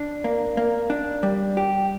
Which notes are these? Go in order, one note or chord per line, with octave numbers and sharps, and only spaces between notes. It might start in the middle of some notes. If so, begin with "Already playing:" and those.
Already playing: D4 D5
A#3
A#3
D4
G3
G4